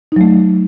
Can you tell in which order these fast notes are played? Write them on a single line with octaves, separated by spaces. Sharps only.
D#4 F#3 A3